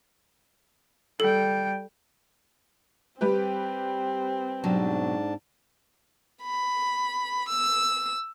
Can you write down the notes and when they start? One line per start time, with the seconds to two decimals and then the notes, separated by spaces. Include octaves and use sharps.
1.20 G3 A4 G5
3.21 G3 C4 G4 B4
4.64 G#2 B2 F#3 D4 A5
6.43 B5
7.49 E6